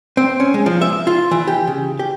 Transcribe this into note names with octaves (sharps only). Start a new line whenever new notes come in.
C4
C#4
G#3
F3
E5
F4
E3
G4
C#3
G4